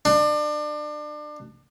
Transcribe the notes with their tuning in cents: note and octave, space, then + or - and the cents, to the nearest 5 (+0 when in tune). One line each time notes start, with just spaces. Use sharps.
D4 +30